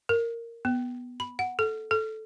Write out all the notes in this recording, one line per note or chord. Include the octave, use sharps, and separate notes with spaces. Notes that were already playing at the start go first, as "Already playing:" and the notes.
A#4
B3
B5
F#5
A4
A4